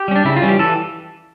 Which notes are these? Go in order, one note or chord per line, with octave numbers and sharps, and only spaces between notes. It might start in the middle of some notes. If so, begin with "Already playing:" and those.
Already playing: G4
G3 C#4
D4
C#3 E4
F4
E3 G3 C#4
G4
E3 A4